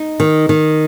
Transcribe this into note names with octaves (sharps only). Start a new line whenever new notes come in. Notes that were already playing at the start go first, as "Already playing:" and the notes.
Already playing: D#4
D#3
D#3